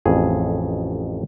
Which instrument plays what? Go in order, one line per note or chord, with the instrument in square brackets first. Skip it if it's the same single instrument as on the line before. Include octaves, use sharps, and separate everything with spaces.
[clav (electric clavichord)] A1 F2 G#4